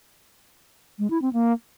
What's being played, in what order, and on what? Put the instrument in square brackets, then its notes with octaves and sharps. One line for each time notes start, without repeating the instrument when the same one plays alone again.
[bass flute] G#3
E4
C4
A#3